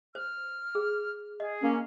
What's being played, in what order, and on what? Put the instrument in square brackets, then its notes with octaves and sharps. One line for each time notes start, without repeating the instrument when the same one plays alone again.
[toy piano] C5 [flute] F6
[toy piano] G#4
[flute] G#4 [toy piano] D#5
[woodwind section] A#3 C#4